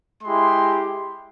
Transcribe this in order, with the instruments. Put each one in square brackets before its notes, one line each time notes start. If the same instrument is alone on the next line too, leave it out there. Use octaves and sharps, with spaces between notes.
[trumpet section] G#3 E4 G4 C6